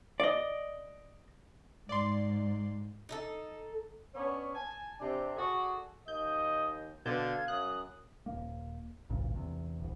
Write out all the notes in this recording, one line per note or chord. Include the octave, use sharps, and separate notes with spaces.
D5 D#5
G#2 D5 C6
D#4 E4 A4
B3 C#4 D4 C#5
G#5 A5
C3 D4
F#4 G#4 A4 D5
D#2 D#5 G6
B2 D3 F5 A5 G6 G#6
F#2 D#6 F#6
D#1 A#3
A1 D2 G2 A#2
E2 C3
D#1 C2